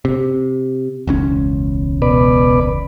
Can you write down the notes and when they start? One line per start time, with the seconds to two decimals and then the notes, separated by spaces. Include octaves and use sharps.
0.05 C3
1.07 E1 C#2 C#4
2.02 B2 B4 D5